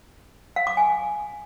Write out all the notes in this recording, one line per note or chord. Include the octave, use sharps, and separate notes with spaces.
F5
D6
G#5